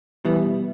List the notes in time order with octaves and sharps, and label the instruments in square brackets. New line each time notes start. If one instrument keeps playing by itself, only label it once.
[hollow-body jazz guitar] B2 G3 B3 [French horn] E3